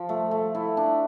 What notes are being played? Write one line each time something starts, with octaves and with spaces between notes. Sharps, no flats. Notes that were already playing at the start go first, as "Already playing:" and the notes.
Already playing: F3
A3
A3
E4
D4